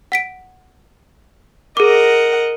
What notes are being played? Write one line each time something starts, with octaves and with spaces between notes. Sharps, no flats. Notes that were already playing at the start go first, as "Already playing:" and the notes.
F#5 B6 D7
G#4 A#4 D#5 F#5 D6